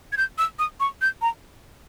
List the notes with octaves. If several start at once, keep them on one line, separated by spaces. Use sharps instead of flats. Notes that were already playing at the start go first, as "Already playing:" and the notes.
G#6
G6
E6
D#6
C#6
G6
A#5